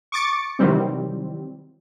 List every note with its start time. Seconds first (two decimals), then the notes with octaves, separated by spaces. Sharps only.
0.12 C#6 D6 A6 C#7
0.59 C3 D#3 E3 F#3 G3 C4